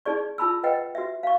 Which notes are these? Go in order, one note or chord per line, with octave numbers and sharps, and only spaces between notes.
D#4 G#4 D5 C#6
F4 A5 B5 E6
B4 D#5 F#5 G5
F#4 E5
F5 C#6